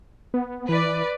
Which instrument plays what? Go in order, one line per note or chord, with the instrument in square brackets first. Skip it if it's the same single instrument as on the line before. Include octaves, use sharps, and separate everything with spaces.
[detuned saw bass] B3
[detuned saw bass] E3 [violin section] B4 D5